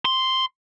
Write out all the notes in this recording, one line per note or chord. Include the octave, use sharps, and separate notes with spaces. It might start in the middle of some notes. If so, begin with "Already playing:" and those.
C6